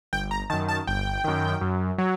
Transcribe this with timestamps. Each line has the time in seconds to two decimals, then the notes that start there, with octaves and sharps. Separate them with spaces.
0.13 G1 G5
0.31 A#5
0.50 F#2 D#3 A5
0.68 A5
0.87 G1 G5
1.24 F#2 D#3
1.61 F#2
1.98 F#3